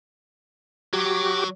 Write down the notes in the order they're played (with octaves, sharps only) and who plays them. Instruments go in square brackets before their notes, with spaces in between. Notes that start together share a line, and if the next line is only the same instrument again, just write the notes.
[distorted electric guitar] F#3 [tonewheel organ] F#4 G4 D6